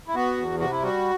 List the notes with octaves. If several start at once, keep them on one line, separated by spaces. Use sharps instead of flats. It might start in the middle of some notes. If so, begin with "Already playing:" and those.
E4
B3 F#4
E2
C3 F#4
E4
G3 F#4